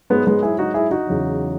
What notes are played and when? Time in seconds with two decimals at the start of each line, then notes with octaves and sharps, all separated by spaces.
0.10 G#2 F#3 G#3 B3
0.27 G#3 B3
0.42 E4 G#4
0.59 D#4 F#4
0.74 E4 G#4
0.91 D#4 F#4
1.07 E2 C#3 F#3